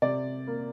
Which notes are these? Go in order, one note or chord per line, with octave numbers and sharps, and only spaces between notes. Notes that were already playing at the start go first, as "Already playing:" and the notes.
C3 D5
A#3